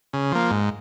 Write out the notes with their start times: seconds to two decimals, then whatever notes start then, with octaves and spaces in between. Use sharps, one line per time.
0.13 C#3
0.32 F3 A#3
0.51 G#2